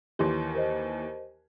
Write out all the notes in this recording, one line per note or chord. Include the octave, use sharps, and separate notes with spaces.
D#2 E3 G4 C#5 C6
A#4 C5 D#5